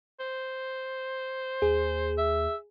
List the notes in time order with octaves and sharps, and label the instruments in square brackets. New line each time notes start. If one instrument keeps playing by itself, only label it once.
[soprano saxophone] C5
[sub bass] D#2 [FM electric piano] G#4
[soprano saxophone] E5